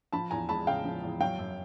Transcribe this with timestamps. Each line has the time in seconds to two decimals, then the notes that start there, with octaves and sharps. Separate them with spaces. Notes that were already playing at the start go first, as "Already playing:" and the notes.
0.13 F3 A5 B5
0.31 E2 G#5 A#5
0.49 G#3 A5 B5
0.67 C#3 F5 G5
0.85 F3
1.03 E2
1.20 F#3 F5 G5
1.39 F#2